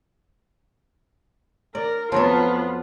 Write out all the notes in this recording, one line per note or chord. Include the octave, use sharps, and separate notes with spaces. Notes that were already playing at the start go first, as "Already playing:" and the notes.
A#4 D5
F2 F#3 B3 F4 A4